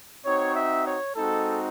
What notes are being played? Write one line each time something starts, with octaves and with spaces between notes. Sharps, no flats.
C4 D#4 F#4 C#5
E5
C#5
G#3 C4 D#4 F#4 A4